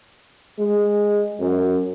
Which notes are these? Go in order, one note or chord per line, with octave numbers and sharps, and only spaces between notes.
G#3
F#2